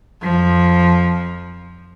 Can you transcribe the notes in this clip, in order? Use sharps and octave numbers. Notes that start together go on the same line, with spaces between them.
F2 F3